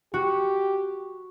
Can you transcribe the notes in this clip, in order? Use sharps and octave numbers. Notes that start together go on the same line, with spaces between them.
F#4 G4